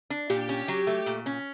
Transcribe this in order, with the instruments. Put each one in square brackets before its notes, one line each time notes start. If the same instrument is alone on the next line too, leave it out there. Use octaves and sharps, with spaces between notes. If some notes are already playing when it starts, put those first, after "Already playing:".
[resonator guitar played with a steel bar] D4
[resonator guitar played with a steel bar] A#2 [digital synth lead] G4
[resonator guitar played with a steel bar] C#4
F#3
A3
A#2
C#4